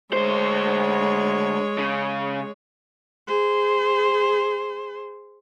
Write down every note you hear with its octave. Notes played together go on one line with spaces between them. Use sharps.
D2 G#3 C5 C#5
C#3
G#4 C5